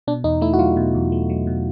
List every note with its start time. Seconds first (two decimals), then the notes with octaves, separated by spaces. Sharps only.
0.07 B2 D4
0.24 E2 D#4
0.41 A3 E4
0.53 F#4
0.59 F#3 F4
0.77 B2
0.95 E2
1.12 A3
1.30 F#3
1.47 B2